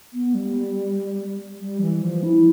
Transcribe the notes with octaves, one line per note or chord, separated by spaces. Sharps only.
B3
G3
G3
E3
F3
E4